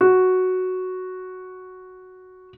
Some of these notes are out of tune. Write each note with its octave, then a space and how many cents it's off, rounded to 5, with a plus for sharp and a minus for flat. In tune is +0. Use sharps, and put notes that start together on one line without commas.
F#4 +0